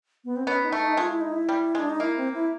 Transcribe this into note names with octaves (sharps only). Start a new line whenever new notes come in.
B3
C4
B3 C#4
D#4
A3
D#4
G#3 F4
E4
D#4
E4
G3
G#3 D4
D#4
A#3 E4
C4
E4